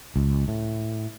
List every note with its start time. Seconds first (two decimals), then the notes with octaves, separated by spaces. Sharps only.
0.16 C#2
0.48 A2